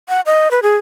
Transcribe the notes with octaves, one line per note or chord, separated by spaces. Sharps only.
F#5
D#5
B4
G#4